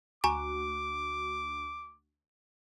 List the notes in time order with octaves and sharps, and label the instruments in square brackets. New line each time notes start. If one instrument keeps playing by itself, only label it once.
[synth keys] D2 F#4 [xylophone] G#5 A#5 C#6 [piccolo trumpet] D6